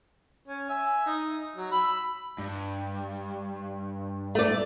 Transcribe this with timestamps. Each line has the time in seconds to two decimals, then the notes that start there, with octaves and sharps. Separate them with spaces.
0.48 C#4
0.69 E5 G#5
1.06 D#4
1.56 F#3
1.72 B5 E6
2.38 G2
4.35 A3 D5